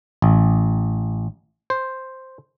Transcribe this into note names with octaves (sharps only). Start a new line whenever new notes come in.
A1
C5